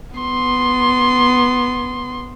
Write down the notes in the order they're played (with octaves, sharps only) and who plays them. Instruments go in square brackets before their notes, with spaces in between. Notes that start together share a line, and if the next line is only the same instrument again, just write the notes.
[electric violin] B3 C6